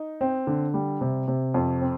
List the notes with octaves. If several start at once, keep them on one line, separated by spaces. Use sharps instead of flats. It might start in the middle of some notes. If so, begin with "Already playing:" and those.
Already playing: D#4
C4
D3
G3
C3
C3
F2
C4